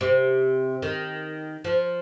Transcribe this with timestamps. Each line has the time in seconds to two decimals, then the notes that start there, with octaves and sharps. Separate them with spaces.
0.01 C3
0.82 D#3
1.64 F3